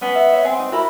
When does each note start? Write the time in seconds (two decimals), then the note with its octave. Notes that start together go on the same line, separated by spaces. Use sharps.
0.02 B3 C#4
0.15 E5
0.32 C#5 E5 F#5
0.44 C4 F#5 G#5
0.59 D#4
0.72 E4 F#4 A#4 B5